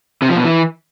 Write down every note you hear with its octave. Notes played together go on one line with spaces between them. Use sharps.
C3
F3
B2
E3